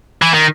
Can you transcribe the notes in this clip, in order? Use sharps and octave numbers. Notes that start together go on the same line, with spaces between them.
E3
D#3